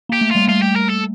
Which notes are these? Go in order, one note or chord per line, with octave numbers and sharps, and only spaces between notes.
A#3 G4
A3
G3 F4
A3 F4
G4
A#4
A4